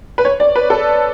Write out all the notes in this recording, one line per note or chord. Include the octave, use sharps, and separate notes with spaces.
B4
C#5
D5
B4
A4